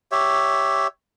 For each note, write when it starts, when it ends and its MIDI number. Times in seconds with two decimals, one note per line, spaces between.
0.12 0.87 67
0.12 0.87 73
0.12 0.87 76